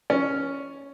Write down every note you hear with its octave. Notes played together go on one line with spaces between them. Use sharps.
C#4